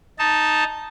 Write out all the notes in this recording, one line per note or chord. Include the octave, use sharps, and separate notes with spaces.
D#4 A5